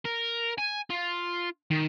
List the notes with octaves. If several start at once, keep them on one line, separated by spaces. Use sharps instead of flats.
A#4
G#5
F4
D#3